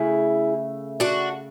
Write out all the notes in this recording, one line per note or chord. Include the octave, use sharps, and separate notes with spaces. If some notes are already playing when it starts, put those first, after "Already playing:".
Already playing: C#3 A3 E4 G#4
D4 F#4